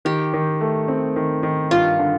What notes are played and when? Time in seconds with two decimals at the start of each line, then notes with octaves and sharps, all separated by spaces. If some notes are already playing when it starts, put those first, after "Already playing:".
0.05 D#3 G4
0.34 D#3
0.61 A3
0.88 C4
1.16 D#3
1.43 D#3
1.71 G2 F4
1.99 D3